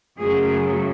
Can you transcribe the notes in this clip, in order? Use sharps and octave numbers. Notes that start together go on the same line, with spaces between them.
F#2 C#3 F#3 A3 G#4